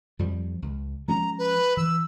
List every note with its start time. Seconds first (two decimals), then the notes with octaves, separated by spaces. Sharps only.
0.19 F2 F3 G3
0.62 C#2
1.08 F3 G#3 C#4 A#5
1.38 B4
1.77 E3 E6